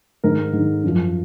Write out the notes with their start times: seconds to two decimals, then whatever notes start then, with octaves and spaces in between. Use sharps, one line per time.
0.24 G#2 D#3 A#4
0.53 G#2 D#3
0.83 F#2 F3